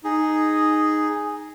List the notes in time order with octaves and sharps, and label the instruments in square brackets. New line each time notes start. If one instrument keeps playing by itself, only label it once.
[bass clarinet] D#4 [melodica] G#4